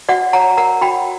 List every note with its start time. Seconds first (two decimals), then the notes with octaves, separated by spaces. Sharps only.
0.09 F#4 D5 F#5
0.33 C#5 F#5 A#5
0.57 A#4 F#5 A#5
0.81 F#4 G5 B5